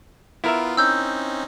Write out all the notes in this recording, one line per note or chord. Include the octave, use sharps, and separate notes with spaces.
B3 E4 F4 A#4 E5
C4 C#4 D#4 E6 G6